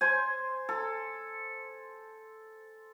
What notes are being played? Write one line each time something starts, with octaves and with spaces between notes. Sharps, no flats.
C5 G#5
A4